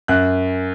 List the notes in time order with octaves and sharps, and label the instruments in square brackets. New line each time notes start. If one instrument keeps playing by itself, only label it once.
[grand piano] F#2 F#6